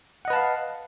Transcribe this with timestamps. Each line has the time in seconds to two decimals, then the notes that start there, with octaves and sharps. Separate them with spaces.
0.25 F#5
0.28 D#5
0.30 B4
0.33 A5
0.36 F5